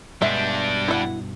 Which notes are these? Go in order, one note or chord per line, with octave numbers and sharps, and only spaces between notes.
G2 B2 G3 G#3 B3 D4 E5
E4 F#5